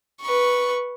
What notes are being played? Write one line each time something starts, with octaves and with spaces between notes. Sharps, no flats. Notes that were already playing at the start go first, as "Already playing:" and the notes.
B4 C#6